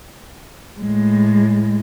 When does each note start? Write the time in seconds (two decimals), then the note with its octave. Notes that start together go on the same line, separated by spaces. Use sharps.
0.80 A2 G#3